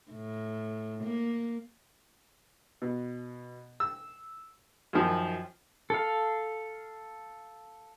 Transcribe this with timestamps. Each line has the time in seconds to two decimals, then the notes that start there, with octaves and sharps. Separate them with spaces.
0.11 A2
1.04 A#3
2.82 B2
3.80 E6
4.93 F#2 D#3 F3
5.90 A4 F5